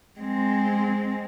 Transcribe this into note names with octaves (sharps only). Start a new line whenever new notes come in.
G#3 C4